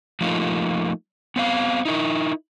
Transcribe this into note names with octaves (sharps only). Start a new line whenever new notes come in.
F3 A3 A#3 D#4 F4
B3 C4 F5
D#4 E4 A#4